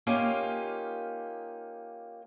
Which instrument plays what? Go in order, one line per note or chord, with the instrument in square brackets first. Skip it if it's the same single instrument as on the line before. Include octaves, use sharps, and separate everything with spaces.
[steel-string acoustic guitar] A#3 C#4 D#4 F4 G4